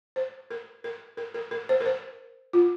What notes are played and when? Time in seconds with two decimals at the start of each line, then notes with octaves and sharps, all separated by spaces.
0.16 C5
0.51 A#4
0.84 A#4
1.17 A#4
1.34 A#4
1.51 A#4
1.69 C5
1.81 A#4
1.86 C5
2.53 F4